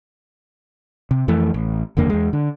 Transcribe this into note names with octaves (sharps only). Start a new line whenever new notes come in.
C3
F2 E3 A3
A1
F#1 E2 D3 A#3
E2 G#3
D3